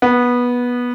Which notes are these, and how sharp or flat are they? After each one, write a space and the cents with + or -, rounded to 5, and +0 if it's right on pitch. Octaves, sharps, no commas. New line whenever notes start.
B3 -15